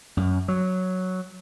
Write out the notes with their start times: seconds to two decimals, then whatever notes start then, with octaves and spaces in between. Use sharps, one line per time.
0.17 F#2
0.48 F#3